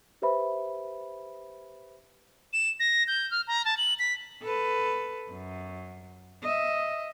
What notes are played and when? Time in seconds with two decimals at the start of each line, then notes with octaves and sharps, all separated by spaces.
0.22 G4 B4 C5 E5 B5
2.53 E7
2.80 A#6
3.07 G6
3.31 F6
3.47 A#5
3.65 A5
3.77 F#7
3.99 B6
4.42 A4 B4
5.31 F#2
6.43 D#5 E5